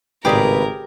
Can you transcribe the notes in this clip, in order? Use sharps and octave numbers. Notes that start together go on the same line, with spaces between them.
G#1 A2 C#3 G4 G#4 A#4 B4 D5